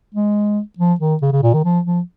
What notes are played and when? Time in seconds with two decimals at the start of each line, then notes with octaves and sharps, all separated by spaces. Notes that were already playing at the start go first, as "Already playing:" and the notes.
0.14 G#3
0.78 F3
1.00 D#3
1.22 C#3
1.32 C#3
1.43 A#2
1.53 D#3
1.65 F3
1.86 F3